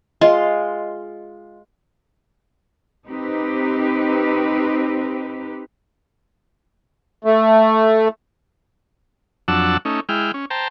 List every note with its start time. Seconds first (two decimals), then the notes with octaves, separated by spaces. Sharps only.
0.21 G#3 F4 D#5
3.07 C4 D#4 G4 B4
7.25 A3
9.48 F2 F#3 D4 F#5 A5 E6
9.85 A3 C#4 D#4
10.09 G#3 E4 G5 F6
10.34 C#4
10.50 C5 G5 A5 A#5